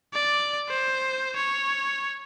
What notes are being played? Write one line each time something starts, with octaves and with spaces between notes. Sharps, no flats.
D5
C5
C#5